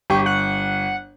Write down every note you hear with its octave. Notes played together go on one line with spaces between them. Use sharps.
G1 G4 C#6
F#5